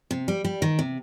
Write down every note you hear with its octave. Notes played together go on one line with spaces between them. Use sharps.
C3
G3
G3
D#3
C3